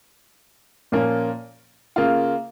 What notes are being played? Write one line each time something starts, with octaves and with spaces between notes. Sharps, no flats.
A#2 F3 A#3 C#4
C#3 A#3 F4